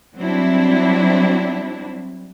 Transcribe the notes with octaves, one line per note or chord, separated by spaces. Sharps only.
F#3 G3 C4 D4 E4